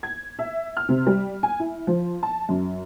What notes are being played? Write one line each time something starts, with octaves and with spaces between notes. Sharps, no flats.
G#6
E5
F6
C3
G3
G#5
E4
F3
A5
F#2